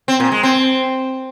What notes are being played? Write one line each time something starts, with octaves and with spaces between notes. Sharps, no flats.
C4
A#2
G#3
C4